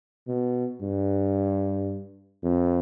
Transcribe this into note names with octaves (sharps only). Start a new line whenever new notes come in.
B2
G2
F2